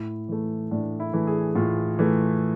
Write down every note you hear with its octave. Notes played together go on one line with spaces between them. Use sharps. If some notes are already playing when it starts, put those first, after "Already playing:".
Already playing: A2 E4
E3 A3
A2 D4
E4
E3 A3
G#4
A2 F4
E3 A3